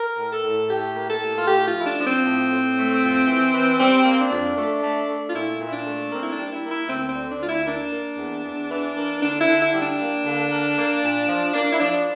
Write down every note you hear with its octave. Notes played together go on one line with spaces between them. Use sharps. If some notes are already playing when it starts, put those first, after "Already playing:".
Already playing: A#4
A2
A4
A2
A2 G4
A#3
A4
A2
F4
A3 G4
F4
F3
E4
D4
F3 D4
C4
A2
A2
A3
F2
E3
E3
G3 C4
A#3
D4
F2
A3
A3
A3
F4
A#2 E4
A#2
E4
D4
A3
A#3 C4
E4
D4
G3
E4
A#3
E4
D2 C4
C4
D3
D4
D2 F4
E4
A#3 D4
A#3
E2
E2
E3
A#3
D3 D4
E4
D3
E4
G3
D4
A#3
D3
A#3
A#3
A#2
F3
A#3 D4
E4
F3 D4